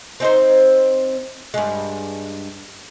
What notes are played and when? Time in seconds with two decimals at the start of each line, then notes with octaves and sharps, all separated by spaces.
0.20 C4 D#4 C5
1.54 G2 G#3